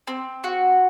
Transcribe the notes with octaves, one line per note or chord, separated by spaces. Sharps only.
C4
F#4